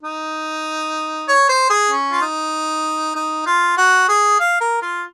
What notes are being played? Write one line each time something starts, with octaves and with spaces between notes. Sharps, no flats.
D#4
C#5
C5
G#4
C#4
F4
D#4
D#4
F4
F#4
G#4
F5
A#4
F4